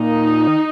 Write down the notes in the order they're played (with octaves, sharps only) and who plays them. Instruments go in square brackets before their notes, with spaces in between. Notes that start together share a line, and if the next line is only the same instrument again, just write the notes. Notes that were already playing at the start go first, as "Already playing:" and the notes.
Already playing: [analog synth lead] A#2 [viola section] D#4
[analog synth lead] D#3